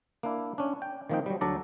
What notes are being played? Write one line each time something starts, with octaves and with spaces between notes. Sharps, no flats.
A#3 D4 E4
C#4 D4
G5
D#3 F3 A#3 C4 D#4 G5
F#3 G3
D2 F#3 D4 A4 D5 A#5